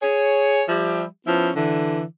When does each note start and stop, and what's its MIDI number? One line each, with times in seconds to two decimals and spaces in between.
0.02 0.63 68
0.02 0.63 73
0.68 1.04 53
0.68 1.04 55
0.68 1.04 67
0.68 1.04 76
1.27 1.51 53
1.27 1.51 59
1.27 1.51 61
1.27 1.51 64
1.56 2.02 50
1.56 2.02 52